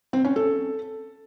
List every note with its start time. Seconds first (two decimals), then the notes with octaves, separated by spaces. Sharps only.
0.13 C4
0.25 C#4
0.36 A4